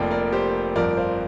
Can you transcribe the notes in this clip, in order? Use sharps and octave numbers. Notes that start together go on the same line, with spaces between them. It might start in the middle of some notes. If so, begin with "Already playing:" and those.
Already playing: F1 F2 F3 A#3 D5 G5
A#4 D5
G4 C5
G1 F2 F3 A#4 D5
C5 F5